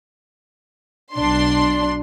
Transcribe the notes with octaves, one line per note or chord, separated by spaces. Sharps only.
B1 D4 C6